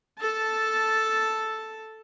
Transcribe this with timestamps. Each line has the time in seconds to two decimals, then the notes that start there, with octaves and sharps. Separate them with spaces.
0.19 A4 A5